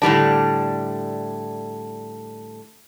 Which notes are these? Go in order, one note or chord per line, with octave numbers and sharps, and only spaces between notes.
A2 D3 G3 D4